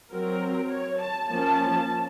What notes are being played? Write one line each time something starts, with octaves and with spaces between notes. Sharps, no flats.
F#3 C4 A#4
C#5
A5
F3 A#3 C#4 A5